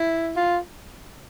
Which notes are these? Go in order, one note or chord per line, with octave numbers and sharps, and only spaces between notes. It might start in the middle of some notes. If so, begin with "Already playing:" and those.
Already playing: E4
F4